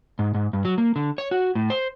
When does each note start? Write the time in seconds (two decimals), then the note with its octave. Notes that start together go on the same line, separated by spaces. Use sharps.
0.19 G#2
0.34 G#2
0.53 G2
0.65 F#3
0.78 A#3
0.96 D3
1.18 C#5
1.31 F#4
1.55 A2
1.70 C5